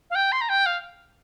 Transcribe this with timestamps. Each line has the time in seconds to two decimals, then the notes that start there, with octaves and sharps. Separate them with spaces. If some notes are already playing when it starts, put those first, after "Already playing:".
0.10 F5
0.15 G5
0.32 C6
0.41 A#5
0.49 G5
0.66 F5